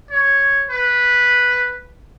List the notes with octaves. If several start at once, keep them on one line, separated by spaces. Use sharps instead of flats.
C#5
B4